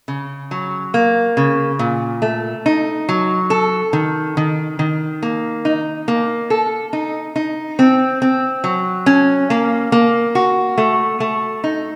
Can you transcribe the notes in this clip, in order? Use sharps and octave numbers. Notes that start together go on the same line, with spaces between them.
C#3
F#3
A#3
C#3
A#2
A3
D#4
F#3
A4
D#3
D#3
D#3
A#3
D#4
A#3
A4
D#4
D#4
C4
C4
F#3
C#4
A#3
A#3
F#4
A3
A3
D#4